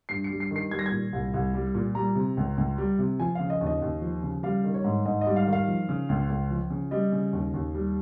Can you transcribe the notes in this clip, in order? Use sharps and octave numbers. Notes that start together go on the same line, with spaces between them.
G2 C7
C#7
G3
C7
D#3 C7
G3 G#6
A#6
G#6
A#2
C2
C2
G3
A#2
G3 A#5
C3
C#2
C#2
G3
C3
F3 G#5
C#3 F5
D#5
D#2
D#5
D#2
F3
C#3
G3 F5
D#3
C#5
G#2
G#2 D#5
D#5
G3
F5
D#3
F5
F3
C#3
C#2
C#2
F3
C#3
G3 D#5
C#3
D#2
D#2
G3